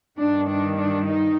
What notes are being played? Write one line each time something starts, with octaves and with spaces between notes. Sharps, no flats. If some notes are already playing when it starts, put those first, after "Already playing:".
G2 D#3 D4
D4
D4
D#4